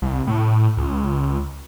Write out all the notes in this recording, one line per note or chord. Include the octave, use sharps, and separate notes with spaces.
C2
A2
C#2